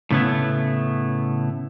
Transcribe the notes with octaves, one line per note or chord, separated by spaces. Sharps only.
A2 C#3 A3 B3 E4